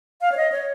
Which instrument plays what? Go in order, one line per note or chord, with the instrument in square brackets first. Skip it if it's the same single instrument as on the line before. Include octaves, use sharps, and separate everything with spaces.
[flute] F5
C#5
D#5
C#5